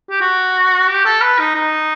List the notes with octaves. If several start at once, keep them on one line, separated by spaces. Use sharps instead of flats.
G4
F#4
G4
A4
B4
D#4
D#4